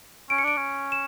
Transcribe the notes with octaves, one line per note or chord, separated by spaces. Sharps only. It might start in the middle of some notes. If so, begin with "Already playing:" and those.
C#4 D7
C#7
D4 D7
C#4
E7